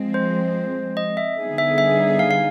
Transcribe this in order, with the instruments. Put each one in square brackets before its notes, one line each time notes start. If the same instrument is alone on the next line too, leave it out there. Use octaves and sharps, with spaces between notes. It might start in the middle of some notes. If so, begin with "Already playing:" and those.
Already playing: [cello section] F3 G#3 C4
[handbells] C5
D#5
E5
[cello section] D3 G3 B3 D#4 G#4
[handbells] E5
E5
F5
F5